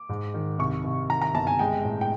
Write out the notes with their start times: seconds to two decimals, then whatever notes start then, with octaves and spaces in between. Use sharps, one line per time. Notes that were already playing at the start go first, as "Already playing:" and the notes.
Already playing: D6
0.09 G#2
0.34 D#3
0.59 C2 C#6
0.84 C2
1.09 D#3 A#5
1.22 A#5
1.34 G1 A5
1.47 G#5
1.59 G#3 G5
1.85 A2
2.01 G5